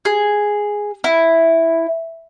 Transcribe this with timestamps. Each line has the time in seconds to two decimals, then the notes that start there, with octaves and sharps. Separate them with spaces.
0.05 G#4
1.04 E4